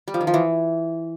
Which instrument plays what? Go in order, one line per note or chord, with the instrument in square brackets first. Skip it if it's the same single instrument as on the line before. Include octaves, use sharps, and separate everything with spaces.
[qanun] G3
F3
D#3
F3
E3